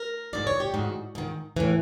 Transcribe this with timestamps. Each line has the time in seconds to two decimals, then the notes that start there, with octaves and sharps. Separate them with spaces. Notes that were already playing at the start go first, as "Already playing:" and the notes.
Already playing: A#4
0.33 G#2 D#3 D5
0.47 C#5
0.60 G4
0.74 G#2 D#3 F#4
1.15 G#2 D#3
1.56 A2 E3